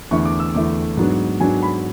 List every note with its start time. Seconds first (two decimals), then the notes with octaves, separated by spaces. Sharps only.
0.11 E2 D3 A3 E4 C#6
0.25 D6
0.40 E6
0.54 E2 D3 A3 E4 D6
0.97 G#2 F#3 B3 D4
1.40 G#2 F#3 B3 D4 G#5
1.63 B5